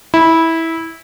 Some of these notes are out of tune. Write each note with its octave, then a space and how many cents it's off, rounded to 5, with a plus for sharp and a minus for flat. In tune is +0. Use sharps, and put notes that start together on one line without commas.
E4 -15